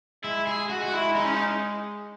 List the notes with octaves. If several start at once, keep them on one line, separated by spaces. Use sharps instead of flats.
G#3 E4
G#4
G#3 F#4
F#4
E4
D#4
C#4
D#4